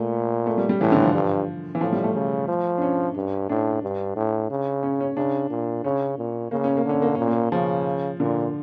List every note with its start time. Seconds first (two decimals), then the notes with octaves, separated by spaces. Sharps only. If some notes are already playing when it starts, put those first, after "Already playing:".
Already playing: A#2 A3
0.47 A3
0.58 G3
0.69 G3
0.81 A2 E3
0.92 D3
1.02 F3
1.14 G2
1.75 E3
1.81 A2 F3
1.92 G3
2.04 A3
2.15 C#3
2.48 F3
2.78 D4
2.82 C#4
3.16 G2
3.49 A2 D4
3.82 G2
4.16 A2
4.50 C#3
4.83 C#4
5.01 C#4
5.17 C#3 D4
5.50 A#2
5.84 C#3 C#4
6.18 A#2
6.51 C#3 A#3
6.64 C#4
6.77 A#3
6.85 D3 C#4
7.02 A#3
7.15 A#2 C#4
7.27 A#3
7.52 C#3 F3
8.20 A#2 D3